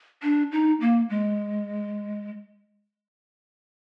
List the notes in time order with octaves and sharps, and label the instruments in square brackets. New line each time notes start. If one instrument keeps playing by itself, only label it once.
[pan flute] D4
D#4
A#3
G#3